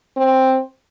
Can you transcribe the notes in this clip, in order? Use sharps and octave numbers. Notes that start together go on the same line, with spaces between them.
C4